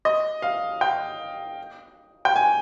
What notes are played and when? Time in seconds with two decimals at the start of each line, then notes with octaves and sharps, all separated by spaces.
0.05 D#5
0.42 F5
0.81 G5
2.25 G5
2.36 G#5